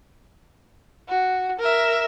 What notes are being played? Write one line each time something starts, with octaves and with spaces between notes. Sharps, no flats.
F#4
A#4 E5